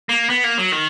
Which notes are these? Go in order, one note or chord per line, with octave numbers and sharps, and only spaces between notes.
A#3
B3
A#3
F#3
D#3